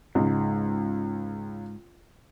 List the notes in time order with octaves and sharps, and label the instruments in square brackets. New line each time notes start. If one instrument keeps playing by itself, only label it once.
[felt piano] C#2 [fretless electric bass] G#2